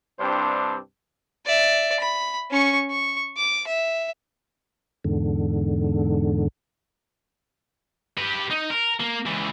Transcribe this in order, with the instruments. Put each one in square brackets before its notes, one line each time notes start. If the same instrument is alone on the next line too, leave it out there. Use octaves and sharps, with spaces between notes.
[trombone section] C2 G2 C4 D4 C5
[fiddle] D5 E5
B5
C#4 C#6
C#6
D6
E5
[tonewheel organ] E2 G#2 D3
[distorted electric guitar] G4 B4
D#4
A#4
A#3
C#2 E3